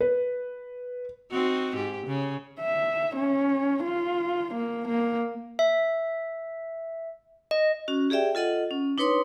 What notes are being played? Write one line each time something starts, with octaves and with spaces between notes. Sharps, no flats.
B4
C4 D#4 F#4
G#2 G4
C#3
E5
C#4
F4
A#3
A#3
E5
D#5
C#4 F#4
G4 G#4 D5 E5 G5
F4 A4 D#5 F#5
C#4
D4 D#4 B4 C#5 C6 D#6